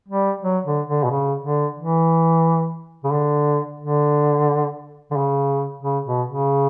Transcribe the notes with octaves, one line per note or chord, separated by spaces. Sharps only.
G3
F#3
D3
D3
B2
C#3
D3
E3
C#3
D3
D3
D3
C#3
C#3
B2
C#3